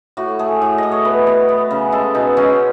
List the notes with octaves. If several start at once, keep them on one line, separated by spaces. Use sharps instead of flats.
A2 F#4
A3 G#4
A2
A2 D#5
C#5
B3 B4
B3
B3
C#3
G#3 A4
B2 D#4
G#3 C#4